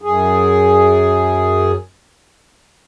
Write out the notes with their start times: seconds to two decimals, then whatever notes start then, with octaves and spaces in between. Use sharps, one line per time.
0.02 F#2 G#4